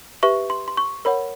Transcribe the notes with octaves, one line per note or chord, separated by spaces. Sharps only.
G4 B4 E5 C#6
C6
C6
C#6
A#4 C#5 F#5 B5